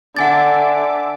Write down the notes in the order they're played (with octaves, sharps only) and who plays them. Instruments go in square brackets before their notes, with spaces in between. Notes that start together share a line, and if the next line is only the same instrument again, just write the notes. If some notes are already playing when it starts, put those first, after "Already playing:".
[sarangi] D3 [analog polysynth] E5 A5 D6 [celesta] F#5 G#5 A6